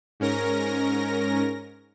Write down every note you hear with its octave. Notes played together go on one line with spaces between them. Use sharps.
G#2 C#4 A#4 A#6